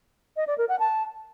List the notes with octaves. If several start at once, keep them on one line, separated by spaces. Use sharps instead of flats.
D#5
D5
A#4
F#5
A5